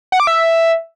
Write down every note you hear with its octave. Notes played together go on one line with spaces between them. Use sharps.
F#5
D6
E5